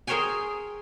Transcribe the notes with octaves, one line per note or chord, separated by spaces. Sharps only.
G#4 A#4 C5 C#5 G5 G#5